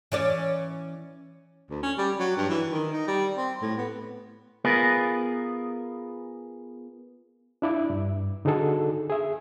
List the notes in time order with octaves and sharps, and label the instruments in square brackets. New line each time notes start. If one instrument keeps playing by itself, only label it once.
[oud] E3 C#4 D5
[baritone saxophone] D2
C#4
G3
F#3
G2
E3
D#3
D#4
G3
C4
A2
B3
[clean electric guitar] B3 F4 G#4 A#4 B4
[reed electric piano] D4 E4 D5 E5
G2
D3 D#4 F#4 G#4 A4
G#4 E5